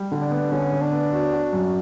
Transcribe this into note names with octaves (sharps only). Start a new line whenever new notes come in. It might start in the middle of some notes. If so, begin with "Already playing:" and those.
Already playing: G3
D3
D4
B3
D3 C#4
D3
D4
B3
F#4
F#4
F#2